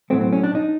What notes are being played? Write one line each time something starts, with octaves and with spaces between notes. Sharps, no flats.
A2 F#3 A3 C4
C4
C#4
D4
D#4